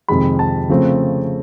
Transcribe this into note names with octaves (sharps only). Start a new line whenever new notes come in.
F2 C3 D#3 G#3 B5
A5
C#3 F3 A3 C4